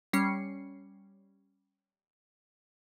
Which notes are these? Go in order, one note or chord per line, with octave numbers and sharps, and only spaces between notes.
G3 C#4 C7 C#7